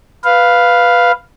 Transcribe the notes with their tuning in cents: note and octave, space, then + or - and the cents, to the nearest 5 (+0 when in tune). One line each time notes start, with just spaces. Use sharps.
B4 +0 F5 +0